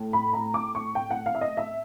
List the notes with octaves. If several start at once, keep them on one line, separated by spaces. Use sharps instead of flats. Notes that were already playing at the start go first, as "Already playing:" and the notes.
Already playing: A2 A3
B5
A#5
D6
C#6
G5
F#5
F5
E5
D#5
E5